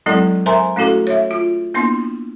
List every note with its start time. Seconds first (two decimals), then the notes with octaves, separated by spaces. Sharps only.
0.06 F#3 G#3 C4 E4 A4 D5
0.46 A#4 C5 E5 G#5 A#5 C6
0.76 A3 C#4 E4 F#4 A4
1.07 C#5 E5
1.31 F4
1.74 A#3 B3 D4 E4 C6